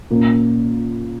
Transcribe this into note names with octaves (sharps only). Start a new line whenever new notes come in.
A#2 A#3 C#4